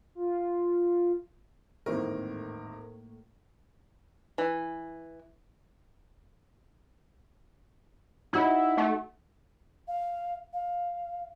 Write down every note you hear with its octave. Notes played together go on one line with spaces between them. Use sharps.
F4
G#1 E2 A2 A#3 C4 A#4
E3
D#4 E4 F#4 D#5
A3
F5
F5